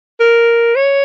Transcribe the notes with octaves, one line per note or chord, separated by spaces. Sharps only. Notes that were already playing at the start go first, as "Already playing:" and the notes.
A#4
C#5